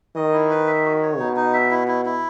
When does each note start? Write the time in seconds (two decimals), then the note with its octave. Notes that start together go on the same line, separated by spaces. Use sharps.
0.16 D#3 D#5
0.33 E4
0.50 B4
0.67 E5
0.85 F#4
1.02 C#5
1.18 B2 D#4
1.36 D#4
1.54 E5
1.71 E4
1.88 E4
2.05 E4